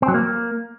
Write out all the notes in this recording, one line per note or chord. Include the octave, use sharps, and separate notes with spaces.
C4
F#3
A#3